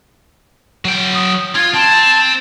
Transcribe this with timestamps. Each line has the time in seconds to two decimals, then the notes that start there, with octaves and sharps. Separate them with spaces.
0.85 F#3 G5
1.15 D#6
1.55 F4 G#6
1.74 C4 A5